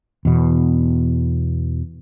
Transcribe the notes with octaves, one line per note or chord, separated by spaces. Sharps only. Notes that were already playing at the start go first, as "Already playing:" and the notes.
E2 B2